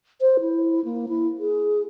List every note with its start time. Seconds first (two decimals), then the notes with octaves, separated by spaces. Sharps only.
0.21 C5
0.41 E4
0.85 A#3
1.09 E4
1.39 G#4